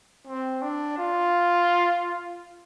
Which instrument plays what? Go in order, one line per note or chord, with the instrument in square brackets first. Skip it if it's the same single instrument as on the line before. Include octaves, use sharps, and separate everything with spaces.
[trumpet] C4
D4
F4